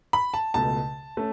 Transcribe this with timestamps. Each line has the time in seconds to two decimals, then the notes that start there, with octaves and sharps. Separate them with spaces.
0.13 B5
0.34 A5
0.54 C#2 B2 A3 A5
1.17 A3 C#4